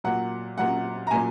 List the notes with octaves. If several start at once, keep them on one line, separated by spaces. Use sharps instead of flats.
A#2 F#3 F#5
A#2 F#3 F#5
A#5
A#2 F#3 G#5